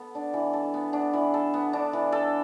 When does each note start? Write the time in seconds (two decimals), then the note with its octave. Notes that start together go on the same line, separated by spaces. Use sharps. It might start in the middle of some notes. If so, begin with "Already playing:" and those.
Already playing: B3 A4
0.15 D4
0.34 E3
0.53 A4
0.74 B3
0.93 D4
1.13 E3
1.34 A4
1.54 B3
1.73 D4
1.93 E3
2.12 A4